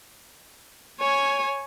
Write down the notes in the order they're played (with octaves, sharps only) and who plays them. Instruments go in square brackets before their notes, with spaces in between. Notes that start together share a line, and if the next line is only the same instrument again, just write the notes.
[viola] C#5 G#5